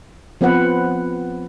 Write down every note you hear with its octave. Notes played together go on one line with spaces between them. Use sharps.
F3 B3 C4 B4 F#5